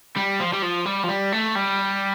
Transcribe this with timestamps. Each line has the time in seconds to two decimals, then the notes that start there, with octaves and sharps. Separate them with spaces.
0.17 G3
0.40 F3
0.53 G3
0.62 F3
0.86 G3
1.03 F3
1.08 G3
1.32 A3
1.55 G3